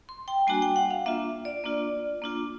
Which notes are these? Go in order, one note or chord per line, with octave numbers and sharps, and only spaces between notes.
C6
G5
G3 A#3 D4 F#4 G#5
G5
F#5
F5
A#3 D4 F4 E5
D5
A#3 D4 F4
A#3 D4 F4